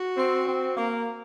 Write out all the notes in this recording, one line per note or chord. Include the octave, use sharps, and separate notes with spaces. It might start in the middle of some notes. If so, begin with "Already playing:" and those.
Already playing: F#4
C4
C4
A#3